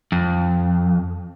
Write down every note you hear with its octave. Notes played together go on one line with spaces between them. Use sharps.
F2